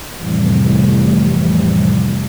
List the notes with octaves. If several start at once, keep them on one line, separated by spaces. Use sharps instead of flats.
F2 A2 C3 E3 G3